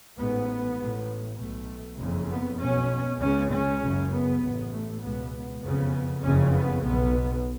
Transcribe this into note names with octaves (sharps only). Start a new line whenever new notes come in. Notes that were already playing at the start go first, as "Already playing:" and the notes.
A1 G#2 B3
A1 A2
B1 B2 A3
F#1 F2 C#3
B3
B1 B2 C#4
C#2 C#3 C#4
C#4
F#1 F#2 C#3
B3
A1 A2
A3
C#2 B2 B3
F#1 F2 C#3 B3
F#1 F2 C#3 C#4
B3
B1 B2 B3